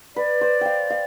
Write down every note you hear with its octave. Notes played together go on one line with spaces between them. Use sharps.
B4 D5
C5
F5 G5
F5